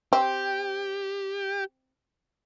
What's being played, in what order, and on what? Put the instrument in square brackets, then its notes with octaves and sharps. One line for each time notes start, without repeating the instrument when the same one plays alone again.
[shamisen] C4 [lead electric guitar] G4